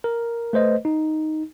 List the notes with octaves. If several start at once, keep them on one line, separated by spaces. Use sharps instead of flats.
A#4
A3 B4 C5 D#5
D#4